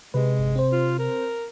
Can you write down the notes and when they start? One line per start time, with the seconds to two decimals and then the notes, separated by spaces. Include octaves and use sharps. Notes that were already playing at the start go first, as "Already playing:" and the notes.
0.14 C3 G#3 B4
0.39 G1
0.56 C4 C5
0.72 F4
0.99 A#4